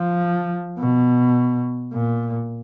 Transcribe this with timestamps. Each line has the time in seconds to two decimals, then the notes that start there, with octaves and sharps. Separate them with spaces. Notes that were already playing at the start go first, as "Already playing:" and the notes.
Already playing: F3
0.79 B2
1.93 A#2